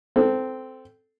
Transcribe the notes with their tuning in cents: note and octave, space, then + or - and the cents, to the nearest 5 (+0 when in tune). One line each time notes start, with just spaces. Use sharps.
C4 -10 A4 +0